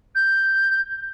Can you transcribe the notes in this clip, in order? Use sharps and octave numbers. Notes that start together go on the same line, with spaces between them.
G6